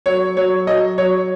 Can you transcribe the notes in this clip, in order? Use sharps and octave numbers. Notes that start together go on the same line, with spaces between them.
F#3 C#5
F#3 C#5
F#3 D#5
F#3 C#5